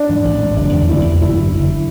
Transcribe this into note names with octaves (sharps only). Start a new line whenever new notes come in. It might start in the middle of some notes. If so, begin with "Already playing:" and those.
Already playing: D4
G#2 E3
A1
G#2 E3
F#1 D4
E2 D3 A3
F#1 E4
E2 D3 A3
F#1 E4
F#2 D3
F#1
D3